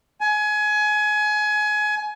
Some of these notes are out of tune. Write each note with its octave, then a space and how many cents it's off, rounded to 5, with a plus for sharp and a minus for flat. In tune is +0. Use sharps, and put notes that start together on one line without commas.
G#5 +25